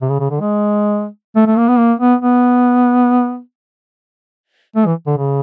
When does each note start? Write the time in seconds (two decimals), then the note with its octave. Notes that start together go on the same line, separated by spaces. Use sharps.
0.02 C3
0.09 C#3
0.20 C#3
0.31 D3
0.41 G#3
1.36 A3
1.47 A3
1.58 A#3
1.68 B3
1.78 A#3
2.00 B3
2.22 B3
4.76 A3
4.86 E3
5.07 D3
5.18 C#3